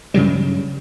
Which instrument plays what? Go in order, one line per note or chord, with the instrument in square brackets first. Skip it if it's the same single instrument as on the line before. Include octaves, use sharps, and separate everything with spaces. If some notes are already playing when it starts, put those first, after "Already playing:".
[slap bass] G2 C#3 F#3 G3